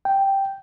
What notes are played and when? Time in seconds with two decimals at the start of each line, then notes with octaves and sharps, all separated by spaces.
0.05 G5